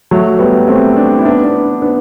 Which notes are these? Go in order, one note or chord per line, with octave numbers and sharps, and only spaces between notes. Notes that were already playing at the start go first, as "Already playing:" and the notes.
F#3 A3
G3 B3
A3 C4
B3 D4
E4
B3 D4
B3 D4
B3 D4